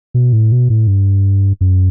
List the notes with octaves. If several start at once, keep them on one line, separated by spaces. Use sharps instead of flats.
B2
A2
B2
A2
G2
F#2